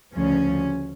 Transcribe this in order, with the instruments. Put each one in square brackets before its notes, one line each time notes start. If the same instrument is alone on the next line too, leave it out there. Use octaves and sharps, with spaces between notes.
[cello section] D2 C#3 F3 C#4